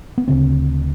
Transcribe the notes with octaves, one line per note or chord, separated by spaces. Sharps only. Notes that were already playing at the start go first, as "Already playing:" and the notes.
B3
D2 C#3 C4